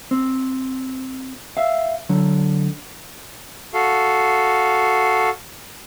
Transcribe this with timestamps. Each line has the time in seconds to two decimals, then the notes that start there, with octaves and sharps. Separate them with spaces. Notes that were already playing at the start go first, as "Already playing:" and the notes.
0.11 C4
1.57 E5 F5
2.09 D3 F#3
3.74 F#4 A4 F5